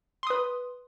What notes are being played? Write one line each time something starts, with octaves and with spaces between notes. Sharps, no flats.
B4 C6 D#6